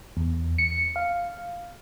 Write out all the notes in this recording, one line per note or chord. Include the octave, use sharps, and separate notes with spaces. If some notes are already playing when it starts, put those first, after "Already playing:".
E2
C#7
F5